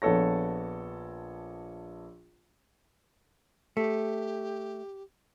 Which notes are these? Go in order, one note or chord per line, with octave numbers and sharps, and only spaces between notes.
A#1 B3 A4 C#5 A#6
A3 G4